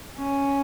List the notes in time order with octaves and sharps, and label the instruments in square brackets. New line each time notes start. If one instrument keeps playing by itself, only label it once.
[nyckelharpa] C#4